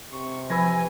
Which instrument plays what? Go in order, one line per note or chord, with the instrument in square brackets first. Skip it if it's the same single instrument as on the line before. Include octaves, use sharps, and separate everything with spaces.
[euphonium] C3 [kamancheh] C#6
[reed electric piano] F3 B4 E6 [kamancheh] G#5 [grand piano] B5 G#6 A#6